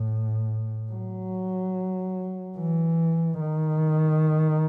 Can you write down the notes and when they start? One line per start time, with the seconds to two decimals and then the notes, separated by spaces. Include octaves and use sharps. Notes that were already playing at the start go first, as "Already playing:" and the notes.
Already playing: A2
0.92 F#3
2.58 E3
3.40 D#3